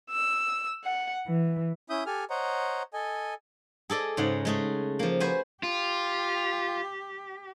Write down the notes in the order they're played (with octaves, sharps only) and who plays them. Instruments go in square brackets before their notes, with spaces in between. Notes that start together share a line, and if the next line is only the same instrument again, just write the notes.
[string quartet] E6
F#5
E3
[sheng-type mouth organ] C#4 E4 E5 D#6 G6
G4 A4 G#5 F6
C5 C#5 D#5 F#5 A#5
A4 D#5 G#5
[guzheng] G#4 A4 D5 D#5
G#2 C#3 G#3 F#5
G#3 A3 G#4
F3 A#3
F#4 B4 C5 G#5
[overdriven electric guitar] F4 [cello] G4